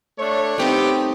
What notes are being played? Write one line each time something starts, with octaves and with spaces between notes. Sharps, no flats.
A3 D4 C#5
G3 A3 B3 C4 D#4 G4